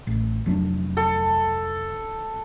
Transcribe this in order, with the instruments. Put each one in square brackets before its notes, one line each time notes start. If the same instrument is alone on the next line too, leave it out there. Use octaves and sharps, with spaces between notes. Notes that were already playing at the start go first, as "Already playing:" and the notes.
[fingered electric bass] A1
F1 F#3 D4
[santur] A4